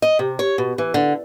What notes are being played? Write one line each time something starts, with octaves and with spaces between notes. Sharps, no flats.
D#5
C3
C#5
B2
E3
D3